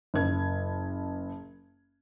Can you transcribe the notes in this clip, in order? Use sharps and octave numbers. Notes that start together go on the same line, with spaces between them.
F#1 G#6